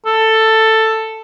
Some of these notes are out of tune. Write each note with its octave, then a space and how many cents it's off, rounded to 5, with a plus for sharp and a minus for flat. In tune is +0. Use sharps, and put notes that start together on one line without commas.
A4 +10